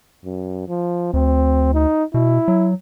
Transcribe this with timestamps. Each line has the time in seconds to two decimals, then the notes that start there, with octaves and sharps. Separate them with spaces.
0.25 F#2
0.68 F3
1.14 D2 C4
1.74 D#4
2.14 B2 E4
2.48 F#3